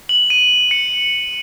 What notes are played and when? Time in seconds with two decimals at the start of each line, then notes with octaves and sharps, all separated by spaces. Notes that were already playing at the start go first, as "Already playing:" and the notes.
0.09 F#7
0.30 D#7
0.71 C#7